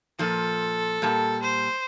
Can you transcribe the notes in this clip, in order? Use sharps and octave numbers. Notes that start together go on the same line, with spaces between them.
A#2 F3 A4
A#2 G3 A5
C5